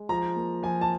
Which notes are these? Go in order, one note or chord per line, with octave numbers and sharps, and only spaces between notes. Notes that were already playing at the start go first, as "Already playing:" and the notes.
Already playing: G#3
F3 A#5
A#3
F3 G#5
A5